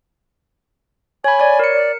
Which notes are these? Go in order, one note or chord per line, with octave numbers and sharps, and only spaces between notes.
C#5 G#5 B5
C#5 D5
A#4 C#7
D5